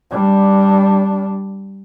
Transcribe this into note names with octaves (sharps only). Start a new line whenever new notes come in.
G3 D4